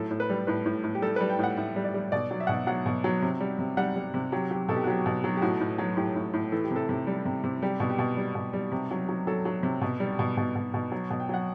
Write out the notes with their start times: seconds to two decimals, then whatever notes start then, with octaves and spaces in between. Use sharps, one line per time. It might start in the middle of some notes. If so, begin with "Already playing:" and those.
Already playing: A2 F#3 A4
0.11 A2
0.20 B4
0.29 G3
0.47 A2 B4
0.66 A2
0.84 A2
0.95 G4
1.02 G3 A4
1.16 G3 B4
1.30 G5
1.39 A2 F#5
1.57 A2 E5
1.76 G3
1.85 D5
1.94 G3
2.12 B2 D5
2.31 F#3
2.40 E5
2.47 B2 F#5
2.54 E5
2.67 F#3 F#5
2.86 B2
3.04 F#3
3.22 C3
3.40 G3
3.59 C3
3.77 G3 F#5
3.96 G3
4.14 C3
4.32 F#3 G4
4.51 F#3 G4
4.69 B2 A4
4.76 G4
4.84 F#4
4.87 F#3 G4
5.06 B2
5.24 F#3
5.37 G4
5.42 A2 F#4
5.60 A2
5.78 F#3
5.97 A2 G4
6.16 A2
6.33 A2
6.52 E3 A4
6.64 G4
6.71 C3
6.76 A4
6.89 C3
7.07 G3
7.25 C3
7.44 C3
7.62 G3 G4
7.80 B2
7.90 G4
7.99 B2
8.17 G3
8.35 B2
8.53 G3
8.72 C3
8.91 F#3
9.09 F#3
9.27 F#3 A4
9.45 F#3
9.63 C3
9.81 B2
10.00 G3
10.19 B2
10.37 B2
10.56 B2
10.74 B2
10.92 F#3
11.10 B2
11.20 G5
11.29 F#3 F#5